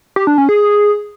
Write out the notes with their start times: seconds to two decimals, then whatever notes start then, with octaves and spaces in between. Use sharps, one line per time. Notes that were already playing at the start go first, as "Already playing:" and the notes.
0.16 G4
0.27 D4
0.38 C#4
0.49 G#4